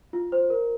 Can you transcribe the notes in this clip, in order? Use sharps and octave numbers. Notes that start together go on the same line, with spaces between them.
F4
C5
A#4